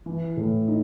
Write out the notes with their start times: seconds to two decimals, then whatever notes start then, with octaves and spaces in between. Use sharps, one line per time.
0.06 E3
0.37 A2
0.68 D#4